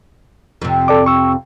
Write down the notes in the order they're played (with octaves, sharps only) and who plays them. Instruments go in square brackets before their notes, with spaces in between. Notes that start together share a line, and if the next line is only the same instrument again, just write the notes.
[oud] F2 C3
[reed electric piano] A4 D5 D6
C#6 E6